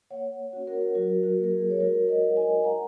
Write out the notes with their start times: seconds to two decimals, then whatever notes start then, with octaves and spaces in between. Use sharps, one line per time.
0.11 A#3 C#5 F#5
0.53 C#4 F#4
0.67 F#4 A#4
0.95 F#3 F#4 A#4
1.23 F#4
1.38 A#3 F#4
1.44 A#4
1.52 G#4
1.70 C#5
1.80 G#3 F#4 A#4
2.08 A#4 D#5
2.22 D#4 F#4
2.30 F#5
2.36 D#5 G#5
2.64 G#3 F#5 A#5